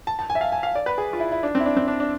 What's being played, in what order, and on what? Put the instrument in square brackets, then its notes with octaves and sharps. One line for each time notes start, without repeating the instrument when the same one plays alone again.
[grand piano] A5
A5
G#5
E5
F5
G#5
F5
D5
B4
G#4
F4
E4
E4
D4
C4
E4
D4
C4
D4
D4